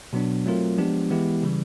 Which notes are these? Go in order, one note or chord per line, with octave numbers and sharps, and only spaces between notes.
B2 F#3 B3 D4
F#3 A3 C4 F4 A#4
F3 G#3 B3 D4 G4
E3 G#3 B3 E4 G4
C#3 E3 G3